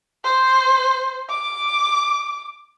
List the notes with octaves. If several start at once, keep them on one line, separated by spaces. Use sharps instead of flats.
C5
D6